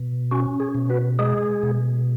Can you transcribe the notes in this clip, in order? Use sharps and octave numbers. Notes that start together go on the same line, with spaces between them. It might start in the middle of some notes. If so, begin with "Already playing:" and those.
Already playing: B2
C#4 F#4
G#4
B2
F#4 B4
G#3 G#4
B2